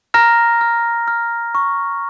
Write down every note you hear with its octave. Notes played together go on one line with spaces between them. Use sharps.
A#5 F6 A#6
F6
F6
C#6